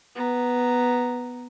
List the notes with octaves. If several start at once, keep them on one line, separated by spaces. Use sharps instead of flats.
B3 A#5